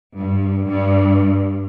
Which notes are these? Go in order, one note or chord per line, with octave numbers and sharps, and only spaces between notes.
G2
G2